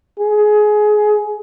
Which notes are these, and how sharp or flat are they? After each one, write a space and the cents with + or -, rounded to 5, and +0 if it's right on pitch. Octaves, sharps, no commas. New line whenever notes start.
G#4 +20